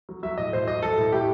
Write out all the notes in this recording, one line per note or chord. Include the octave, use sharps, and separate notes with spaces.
F#3
F#3 E5
A2 D#5
A2 C5
F#3 D#5
F#3 A4
A2
A2 G4